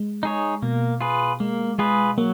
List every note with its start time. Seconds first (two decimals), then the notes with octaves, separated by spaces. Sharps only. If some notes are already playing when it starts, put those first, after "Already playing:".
Already playing: G#3
0.23 D#4 G#4 C#5
0.62 B2 A#3
1.01 F4 G#4 B4
1.40 G#3 A#3
1.79 G#3 F4 G#4 B4
2.18 F#3 A#3